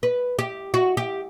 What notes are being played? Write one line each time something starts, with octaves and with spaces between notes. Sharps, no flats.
B4
G4
F#4
G4